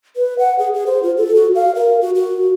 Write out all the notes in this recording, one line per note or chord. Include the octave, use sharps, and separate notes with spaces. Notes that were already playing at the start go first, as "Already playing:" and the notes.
B4
F#5
G#4
G#4
C5
F4
A4
F#4
F5
A#4
F#4
F#4